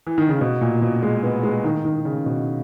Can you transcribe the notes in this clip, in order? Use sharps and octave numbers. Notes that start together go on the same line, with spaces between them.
E3
D#3
C#3
B2
A#2
B2
G#3
B3
G#3
D#3
D#3
C#3
B2